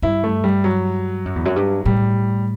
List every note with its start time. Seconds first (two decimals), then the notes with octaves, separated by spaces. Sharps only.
0.02 G2 E4
0.24 A3
0.44 G3
0.64 F#3
1.25 F#2
1.35 E2
1.45 F#2
1.56 G2
1.85 A2 G3